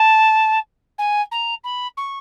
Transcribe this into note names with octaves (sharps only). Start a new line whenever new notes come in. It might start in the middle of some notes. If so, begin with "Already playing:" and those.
Already playing: A5
G#5
A#5
B5
C#6